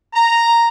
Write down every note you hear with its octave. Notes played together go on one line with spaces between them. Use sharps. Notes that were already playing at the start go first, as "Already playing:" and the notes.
A#5